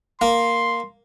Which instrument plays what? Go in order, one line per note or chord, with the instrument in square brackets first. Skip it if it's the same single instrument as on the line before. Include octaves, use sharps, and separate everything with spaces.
[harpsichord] A#3 [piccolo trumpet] C6